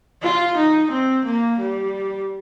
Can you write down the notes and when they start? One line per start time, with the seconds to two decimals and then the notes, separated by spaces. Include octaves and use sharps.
0.22 F4
0.57 D#4
0.91 C4
1.25 A#3
1.59 G3